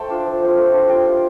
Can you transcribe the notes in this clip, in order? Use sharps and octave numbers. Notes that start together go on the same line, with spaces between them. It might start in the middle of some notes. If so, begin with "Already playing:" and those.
Already playing: A3 A4 C5 G5 A5
D4 F4
F3
C4 F4
A3
D4 F4
G3 G5
F4